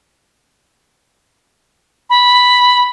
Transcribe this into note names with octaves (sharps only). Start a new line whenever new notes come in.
B5